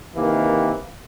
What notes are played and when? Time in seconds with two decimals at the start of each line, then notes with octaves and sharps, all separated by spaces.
0.16 C3 D#3 E3 A#3